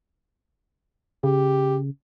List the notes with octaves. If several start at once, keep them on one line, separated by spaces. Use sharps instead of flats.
C#3 G4